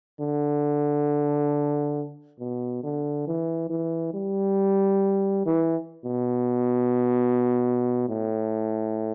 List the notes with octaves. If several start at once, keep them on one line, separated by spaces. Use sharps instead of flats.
D3
B2
D3
E3
E3
G3
E3
B2
A2